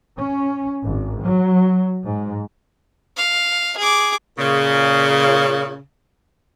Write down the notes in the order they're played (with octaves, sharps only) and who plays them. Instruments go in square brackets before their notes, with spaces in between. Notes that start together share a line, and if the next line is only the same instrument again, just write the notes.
[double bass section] C#4
G#1
F#3
G#2
[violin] F5
G#4 D6
[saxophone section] A#2 C#3